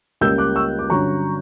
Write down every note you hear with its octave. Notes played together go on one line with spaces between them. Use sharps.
C#2 C#3 G3 A#3 E6 G6
D6 F#6
C#6 E6
D6
G2 D3 F#3 C#4 A#5 C#6